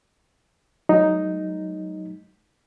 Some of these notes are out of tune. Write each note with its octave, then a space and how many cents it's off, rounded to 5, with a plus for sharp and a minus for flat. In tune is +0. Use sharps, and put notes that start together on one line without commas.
F#3 +10 A3 -45 D#4 +0